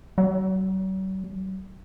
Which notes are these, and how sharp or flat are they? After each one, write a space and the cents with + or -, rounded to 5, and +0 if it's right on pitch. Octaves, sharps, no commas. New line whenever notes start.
F#3 +45